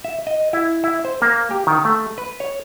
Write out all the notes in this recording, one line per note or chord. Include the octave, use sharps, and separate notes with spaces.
E5
D#5
E4
E4
C5
A#3
G4
D#3
A3
B4
C#5